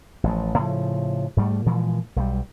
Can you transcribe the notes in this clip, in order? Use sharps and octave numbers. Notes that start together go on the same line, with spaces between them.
A1 F3
A2 C#3 F3
G#2 G3 A3
A#2 E3 F3 G#3
B1 F3 G3